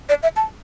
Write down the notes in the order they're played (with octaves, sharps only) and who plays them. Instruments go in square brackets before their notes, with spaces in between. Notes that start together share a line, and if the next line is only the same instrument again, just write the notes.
[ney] D5
E5
A5